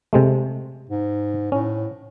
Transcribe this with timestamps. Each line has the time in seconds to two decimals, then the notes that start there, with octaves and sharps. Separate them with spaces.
0.13 C3 G#3 A3
0.90 G#2
1.52 A2 C#4